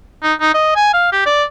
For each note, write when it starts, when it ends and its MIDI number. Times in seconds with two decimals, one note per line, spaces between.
0.23 0.34 63
0.41 0.51 63
0.54 0.75 75
0.76 0.90 80
0.94 1.11 77
1.12 1.21 67
1.26 1.43 74